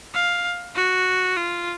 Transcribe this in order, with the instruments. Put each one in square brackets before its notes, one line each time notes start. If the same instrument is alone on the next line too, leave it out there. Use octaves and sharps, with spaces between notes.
[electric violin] F5
F#4
F4